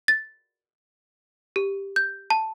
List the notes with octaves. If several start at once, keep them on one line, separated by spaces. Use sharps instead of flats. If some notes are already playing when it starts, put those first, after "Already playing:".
A6
G4
G6
A5